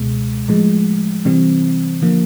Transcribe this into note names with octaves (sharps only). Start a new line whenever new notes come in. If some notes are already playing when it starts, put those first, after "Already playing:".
Already playing: C#2 B2 G#3
A2 F3 G#3
C3 E3 G3 C4
D3 F3 A#3